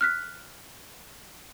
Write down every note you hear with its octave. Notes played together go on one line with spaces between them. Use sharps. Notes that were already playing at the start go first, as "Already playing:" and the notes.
F6 F#6 B6